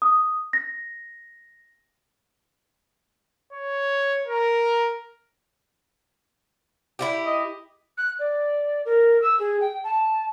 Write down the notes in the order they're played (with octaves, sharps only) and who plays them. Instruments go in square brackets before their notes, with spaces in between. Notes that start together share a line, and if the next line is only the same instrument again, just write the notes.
[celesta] D#6
A#6
[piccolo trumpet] C#5
A#4
[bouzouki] E4 F4 G4
[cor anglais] D#5
[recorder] F#6
D5
A#4
E6
G#4
G5
A5